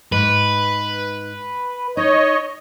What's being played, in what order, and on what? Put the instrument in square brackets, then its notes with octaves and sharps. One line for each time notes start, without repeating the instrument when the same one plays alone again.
[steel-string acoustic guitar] G#2 [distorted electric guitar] B4
[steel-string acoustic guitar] D#4 [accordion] C#5 D#5